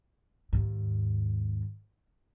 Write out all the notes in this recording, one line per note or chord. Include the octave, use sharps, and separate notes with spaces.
D#2 G#2